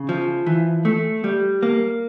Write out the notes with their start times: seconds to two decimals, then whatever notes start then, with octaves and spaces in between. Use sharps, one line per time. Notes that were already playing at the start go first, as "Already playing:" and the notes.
Already playing: C#3
0.09 F3
0.46 E3
0.85 A3
1.24 G3
1.63 A#3